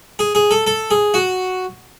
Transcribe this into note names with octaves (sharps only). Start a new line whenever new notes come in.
G#4
G#4
A4
A4
G#4
F#4